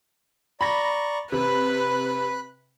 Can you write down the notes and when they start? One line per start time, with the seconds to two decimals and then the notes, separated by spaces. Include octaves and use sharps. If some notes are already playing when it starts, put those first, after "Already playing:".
0.61 D5 A#5 B5 C#6 A#6
1.32 C3 B4 B5 F#6